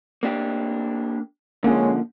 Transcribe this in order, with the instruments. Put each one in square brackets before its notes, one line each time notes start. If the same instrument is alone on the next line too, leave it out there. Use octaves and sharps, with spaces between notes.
[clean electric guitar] A#3 D4 G4
[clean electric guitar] D3 F3 [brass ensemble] G#3 C#4 [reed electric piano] A#3